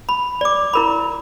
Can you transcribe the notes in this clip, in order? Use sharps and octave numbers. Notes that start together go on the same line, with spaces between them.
B5
D5 D6
E4 A#4 B5